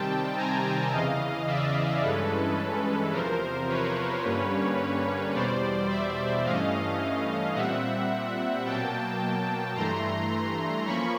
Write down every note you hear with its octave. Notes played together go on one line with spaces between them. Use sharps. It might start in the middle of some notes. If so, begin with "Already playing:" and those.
Already playing: C3 D#3 G3 C4 G5 A5
G#5 A#5
E2 C#3 E3 D#5 F5
D5 E5
G2 E3 G#3 C#4 A4 B4
E2 C3 F3 A#4 C5
B4 C#5
G2 D3 G3 A#3 C#4
E2 B2 G3 C5 D5
D5 E5
G2 E3 A3 C#4 D#5 F5
A#2 G3 C4 E5 F#5
B2 F#3 A#3 G5 A5
G2 E3 A3 A#5 C6
F3 A#3 C#4 B5 C#6